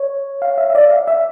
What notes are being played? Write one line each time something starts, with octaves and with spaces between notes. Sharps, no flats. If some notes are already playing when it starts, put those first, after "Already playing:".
Already playing: C#5
F5
E5
E5
D5
F5
E5